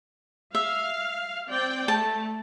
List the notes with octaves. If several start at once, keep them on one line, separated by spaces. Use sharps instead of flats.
E5 F5
C4 D5 G5
A3 A5